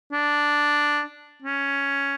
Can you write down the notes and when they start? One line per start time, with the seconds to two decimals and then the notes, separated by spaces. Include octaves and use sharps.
0.12 D4
1.42 C#4